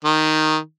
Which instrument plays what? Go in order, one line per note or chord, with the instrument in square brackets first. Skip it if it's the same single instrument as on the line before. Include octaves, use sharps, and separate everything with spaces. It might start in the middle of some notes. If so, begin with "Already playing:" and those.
[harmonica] D#3